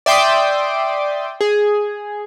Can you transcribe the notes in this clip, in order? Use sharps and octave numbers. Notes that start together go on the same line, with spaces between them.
D5 E5 G5 C6 D6 D#6
G#4